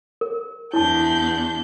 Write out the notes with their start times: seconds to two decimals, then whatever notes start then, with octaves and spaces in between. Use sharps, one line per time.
0.21 A#4
0.73 E2 D4 E4 A5 G6